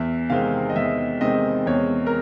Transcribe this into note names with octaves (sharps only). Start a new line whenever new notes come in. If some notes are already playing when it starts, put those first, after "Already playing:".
Already playing: E2 E5
C3 D#3 G#3 C4 F5
D#5
E2 E5
C3 D#3 G#3 C4 D#5
E2 C#5
A#4